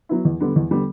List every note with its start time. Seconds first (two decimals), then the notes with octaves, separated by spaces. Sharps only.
0.09 F#3 B3 E4
0.25 E2
0.40 D3 G3 B3
0.56 E2
0.71 D3 G3 B3